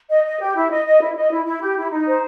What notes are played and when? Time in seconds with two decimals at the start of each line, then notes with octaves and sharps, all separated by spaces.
0.10 D#5
0.25 D#5
0.40 G4
0.56 E4
0.71 D#5
0.85 D#5
1.01 E4
1.16 D#5
1.31 E4
1.46 E4
1.62 G4
1.76 E4
1.91 D#4
2.07 C5